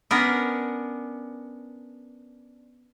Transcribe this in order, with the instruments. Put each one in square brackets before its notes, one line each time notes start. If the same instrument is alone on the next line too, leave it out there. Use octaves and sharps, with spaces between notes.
[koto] B3 C#4 D4 A#4